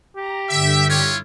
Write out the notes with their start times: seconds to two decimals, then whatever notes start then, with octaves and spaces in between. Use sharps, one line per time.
0.16 G4 A#5
0.50 G2 D3 E5
0.90 E4 F4 C#5